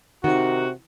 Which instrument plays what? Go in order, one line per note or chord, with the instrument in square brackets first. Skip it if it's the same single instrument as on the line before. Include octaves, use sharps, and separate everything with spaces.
[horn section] C3 F#4 [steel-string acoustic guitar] D#3